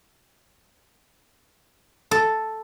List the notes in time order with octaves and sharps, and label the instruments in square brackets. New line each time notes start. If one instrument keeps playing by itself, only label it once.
[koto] A4